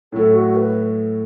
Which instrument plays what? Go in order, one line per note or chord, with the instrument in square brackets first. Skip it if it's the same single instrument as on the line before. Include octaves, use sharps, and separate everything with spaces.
[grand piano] A2 F#3 A3 [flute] A4
[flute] F#4
B4